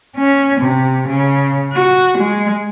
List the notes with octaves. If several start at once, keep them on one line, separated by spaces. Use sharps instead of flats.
C#4
C3
C#3
F#4
G#3